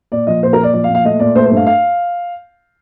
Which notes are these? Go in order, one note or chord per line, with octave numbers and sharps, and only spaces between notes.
A#2 D5
F3 D#5
A#2 C5
A#4
A#2
D5
F3 D5
F5
A#2
F5
A3 D#5
A#2 D5
A3 C5
C5
G2
F5
F5